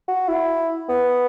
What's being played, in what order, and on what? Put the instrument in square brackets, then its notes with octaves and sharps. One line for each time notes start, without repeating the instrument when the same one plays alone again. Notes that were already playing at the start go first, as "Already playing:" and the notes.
[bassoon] F#4
E4
B3